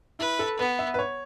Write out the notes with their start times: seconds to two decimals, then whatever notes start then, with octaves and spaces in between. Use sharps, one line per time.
0.19 E4 B4
0.39 A4
0.59 B3 B4
0.79 E5
0.94 B4
0.99 C#5